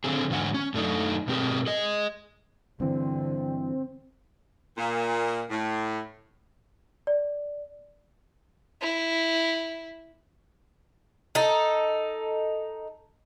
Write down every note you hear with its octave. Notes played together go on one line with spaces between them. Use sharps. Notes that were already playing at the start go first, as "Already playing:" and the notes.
D3 C4 G#4
E2 G#2 D3 F4 F#5 G#5
C#4
F#2 A3 D4 D#4
G2 B2 C4 G4 G#4 A#4
G#4 D#5
G2 D3 E3 C4
A#2
A2
D5
E4
D#4 A4